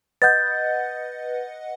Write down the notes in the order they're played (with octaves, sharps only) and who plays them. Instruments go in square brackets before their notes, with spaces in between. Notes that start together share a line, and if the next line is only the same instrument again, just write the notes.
[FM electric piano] B4 D#5 F#5 [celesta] G6 A6